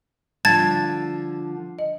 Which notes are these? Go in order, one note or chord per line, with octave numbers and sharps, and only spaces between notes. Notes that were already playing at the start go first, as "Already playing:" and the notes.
D3 F3 G3 A5 G#6 A6
D#5